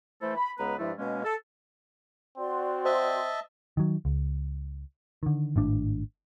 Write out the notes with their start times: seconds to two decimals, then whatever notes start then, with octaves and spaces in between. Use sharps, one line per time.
0.22 E3 A3 E4 A4 C5
0.37 B5
0.59 C#2 G#3 B3 B4 A#5
0.79 G2 F3 G#3 A3 E4
0.98 B2 G#3 A#3 C#4
1.24 A4
2.38 C4 F#4 D5 C6
2.85 C5 D#5 E5 A5
3.77 D#3 F#3
4.05 C#2
5.23 D3 D#3
5.56 G#1 A2 D4